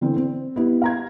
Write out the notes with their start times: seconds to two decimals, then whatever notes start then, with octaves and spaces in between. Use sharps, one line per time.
0.01 D3 E3 C4
0.16 C4
0.56 B3 E4 G4
0.82 F5 A#5 G#6